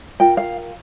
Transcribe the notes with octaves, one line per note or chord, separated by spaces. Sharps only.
F4 A#4 G5
F5